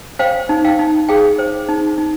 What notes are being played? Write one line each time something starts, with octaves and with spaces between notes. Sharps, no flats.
C5 F5 G5
D#4
F5 G5
D#4
G#4 F5 G5
C5
D#4
D#4